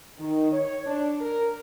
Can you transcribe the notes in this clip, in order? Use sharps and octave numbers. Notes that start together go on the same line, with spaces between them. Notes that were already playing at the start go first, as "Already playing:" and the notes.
D#3
C#5
D4
A#4